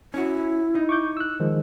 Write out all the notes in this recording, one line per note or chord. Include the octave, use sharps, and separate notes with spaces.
C#4 E4 F#4
D#4
C#6 D6 G6
E6 F#6
D#3 F3 G#3